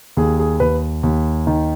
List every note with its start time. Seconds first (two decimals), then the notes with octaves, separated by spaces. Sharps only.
0.17 D#2 G#4
0.39 G#4
0.60 D#2 B4
1.03 D#2
1.47 D#3